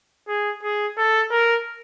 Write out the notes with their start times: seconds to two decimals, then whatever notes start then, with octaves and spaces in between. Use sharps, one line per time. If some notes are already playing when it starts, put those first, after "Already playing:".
0.28 G#4
0.63 G#4
0.98 A4
1.31 A#4